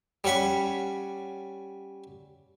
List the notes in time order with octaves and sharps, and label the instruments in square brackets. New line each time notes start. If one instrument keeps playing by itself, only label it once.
[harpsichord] G3 C#4 F#5 B5 C#6